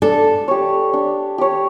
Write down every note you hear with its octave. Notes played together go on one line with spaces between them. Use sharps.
D4 A4
G4 C#5
D4
G4 C#5